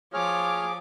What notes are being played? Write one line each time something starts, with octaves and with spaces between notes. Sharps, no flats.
F3 G#4 C#5 D6 F6